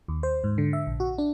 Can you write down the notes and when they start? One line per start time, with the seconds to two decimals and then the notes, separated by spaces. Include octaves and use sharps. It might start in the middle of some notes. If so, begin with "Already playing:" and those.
0.08 D#2
0.23 C5
0.44 G#2
0.58 D3
0.73 E5
0.87 A#1
1.00 F#4
1.18 D4